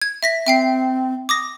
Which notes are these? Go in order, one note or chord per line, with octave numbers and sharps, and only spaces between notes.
G#6
E5 A#6 B6
C4 E5 G5 C7
D6 D#6 A#6